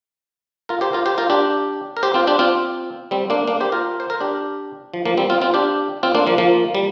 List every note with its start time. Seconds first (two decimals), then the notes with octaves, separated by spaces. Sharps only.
0.69 F4 A#4
0.81 G4 C5
0.93 F4 A#4
1.06 G4 C5
1.18 F4 A#4
1.30 D4 G4
1.97 A#4
2.03 G4 C5
2.14 C4 F4
2.27 D4 G4
2.39 C4 F4
3.11 G3 C4
3.30 A#3 D4
3.48 A#3 D4
3.60 G4 C5
3.72 F4 A#4
4.00 C5
4.10 A#4
4.20 D4 G4
4.94 F3
5.05 F3 A#3
5.17 G3 C4
5.30 C4 F4
5.42 C4 F4
5.54 D4 G4
6.03 C4 F4
6.15 A#3 D4
6.27 F3 A#3
6.38 F3 A#3
6.75 G3